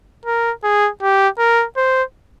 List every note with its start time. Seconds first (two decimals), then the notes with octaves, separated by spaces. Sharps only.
0.26 A#4
0.63 G#4
1.02 G4
1.39 A#4
1.77 C5